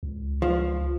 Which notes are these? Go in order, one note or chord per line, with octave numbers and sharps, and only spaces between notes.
C#2
F3